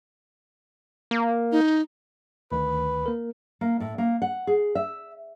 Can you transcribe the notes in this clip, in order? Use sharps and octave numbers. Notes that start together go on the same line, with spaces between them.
A#3
D#4
D2 D#3 B4
A#3 A#4
A#3
A2
A#3
F#5
G#4
E5